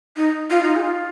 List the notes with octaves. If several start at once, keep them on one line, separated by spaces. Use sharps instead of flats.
D#4
F4
D#4
G#4
F4